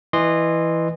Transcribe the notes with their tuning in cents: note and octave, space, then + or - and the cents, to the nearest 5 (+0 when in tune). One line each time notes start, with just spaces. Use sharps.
E3 +0 D#5 -25 C6 +0